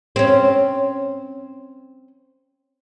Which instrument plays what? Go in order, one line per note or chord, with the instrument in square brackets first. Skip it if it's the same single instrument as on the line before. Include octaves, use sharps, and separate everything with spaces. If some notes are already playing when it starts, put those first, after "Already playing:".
[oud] C4 C#4